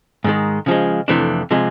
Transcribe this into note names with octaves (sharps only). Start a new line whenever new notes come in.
G#2 D#3 G#3
C#3 F3 G#3
F2 C3 E3 A3 D4
C3 F3 G#3